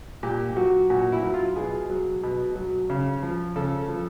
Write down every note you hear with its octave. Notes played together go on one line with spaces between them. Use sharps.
A#2 G4
F#3 F#4
A#2 F#4
E4
F#3
F4
B2 G#4
F#3
B2
F#3
C#3
F3
C#3 A4
F3